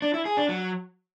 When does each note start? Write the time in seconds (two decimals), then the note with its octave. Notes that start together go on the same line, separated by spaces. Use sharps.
0.02 D4
0.14 E4
0.25 G#4
0.37 D4
0.49 F#3